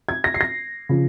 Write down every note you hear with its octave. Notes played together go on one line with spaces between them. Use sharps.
G#6
A#6
C7
A#6
C#3 F3